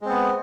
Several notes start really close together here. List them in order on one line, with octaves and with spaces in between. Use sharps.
G#3 C4 B3